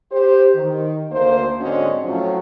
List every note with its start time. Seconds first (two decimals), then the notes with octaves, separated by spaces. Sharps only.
0.12 G4 C5
0.54 D#3
1.11 D2 A#3 C5
1.60 G#2 D3 C4 C#4 F#4 D#5
2.03 A2 F3 F#3 C#4